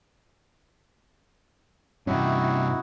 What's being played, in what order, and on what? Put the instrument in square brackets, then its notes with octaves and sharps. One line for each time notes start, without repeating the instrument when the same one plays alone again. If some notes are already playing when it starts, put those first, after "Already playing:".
[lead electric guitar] G2 C3 [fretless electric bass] C#4 [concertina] D#4 E4 F#4